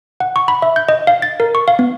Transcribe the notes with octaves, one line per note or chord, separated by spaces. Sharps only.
F#5
C#6
B5
E5
G6
D#5
F5
A6
A#4
C#6
F5
B3